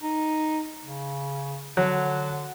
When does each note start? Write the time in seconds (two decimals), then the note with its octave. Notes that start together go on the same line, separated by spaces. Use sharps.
0.03 D#4
0.81 C#3
1.77 D3 F#3